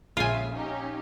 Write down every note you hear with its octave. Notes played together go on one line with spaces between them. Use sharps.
A#1 C#3 F4 E5 G#5
C#4 D#4 G4